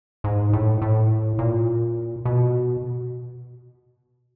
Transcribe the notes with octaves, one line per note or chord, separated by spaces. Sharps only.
G#2
A2
A2
A#2
B2